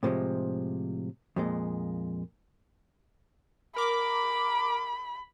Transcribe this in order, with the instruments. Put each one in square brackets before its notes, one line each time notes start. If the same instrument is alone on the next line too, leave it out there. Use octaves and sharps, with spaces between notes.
[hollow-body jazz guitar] A2 C3 F3 G#3
F2 A#2 G#3
[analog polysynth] A#4 D6 [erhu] B5